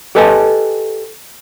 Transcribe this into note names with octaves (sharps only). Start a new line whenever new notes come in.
G4 A4 B4 D#5 G#5 A5